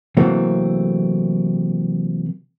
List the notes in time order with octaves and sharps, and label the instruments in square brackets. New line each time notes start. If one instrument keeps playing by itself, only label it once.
[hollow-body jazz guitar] C3 E3 F#3 A3 A#3 C4